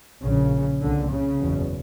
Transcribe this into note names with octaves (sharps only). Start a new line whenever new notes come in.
A#1 A#2 C#3
C2 A#2 D3
C#3
F#1 E2 B2